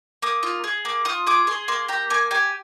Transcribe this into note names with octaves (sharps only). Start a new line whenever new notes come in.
A#3 D#6
F4
G#4
A#3
F4 D#6
G#4 D6
G#4 C6
A#3 C6
G4 A#5
A#3 G#5
G4 G#5